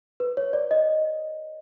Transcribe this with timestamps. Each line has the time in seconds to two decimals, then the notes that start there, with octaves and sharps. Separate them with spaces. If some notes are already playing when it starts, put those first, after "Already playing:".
0.20 B4
0.37 C#5
0.53 D5
0.71 D#5